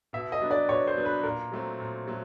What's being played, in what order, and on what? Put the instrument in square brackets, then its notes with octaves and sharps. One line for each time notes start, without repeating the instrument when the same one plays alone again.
[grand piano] B2 [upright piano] E5
[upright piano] D#5
[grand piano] F#3 B3 D4
[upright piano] D5
[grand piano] B2 [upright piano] C#5
[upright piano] C5
[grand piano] F#3 B3 D4
[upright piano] B4
[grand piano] A#2 [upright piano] A#4
[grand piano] F#3 A3 C4
A#2
F#3 A3